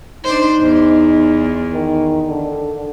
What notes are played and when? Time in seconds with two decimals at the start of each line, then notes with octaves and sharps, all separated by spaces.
0.25 D4 D#4 C5
0.60 E2
1.73 D#3
2.27 D3